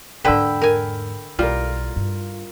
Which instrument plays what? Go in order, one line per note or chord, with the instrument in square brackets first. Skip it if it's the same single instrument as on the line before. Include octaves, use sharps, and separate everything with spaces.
[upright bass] E2 G#2 [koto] D3 B4 [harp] G5 B5 E6
[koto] A#4 G#5
[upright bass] B1 A#3 [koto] G3 [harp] F4 A#4
[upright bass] G2